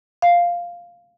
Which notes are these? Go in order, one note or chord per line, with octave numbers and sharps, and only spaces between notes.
F5